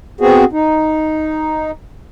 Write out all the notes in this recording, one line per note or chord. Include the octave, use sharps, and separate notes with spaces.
B3 C4 F#4 G#4
D#4